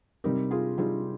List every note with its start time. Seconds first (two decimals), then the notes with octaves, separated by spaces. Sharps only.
0.24 C3 G3 C4 D#4 G4 A#4
0.51 F4 G#4
0.78 C3 G3 C4 D#4 F4 G#4